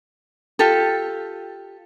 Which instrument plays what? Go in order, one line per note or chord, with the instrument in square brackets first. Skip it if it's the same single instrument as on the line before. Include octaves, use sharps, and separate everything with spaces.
[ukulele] F4 G4 A4